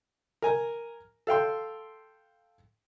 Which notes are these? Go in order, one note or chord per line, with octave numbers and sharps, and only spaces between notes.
A#4 G#5 A#5
A4 F5 G5 C6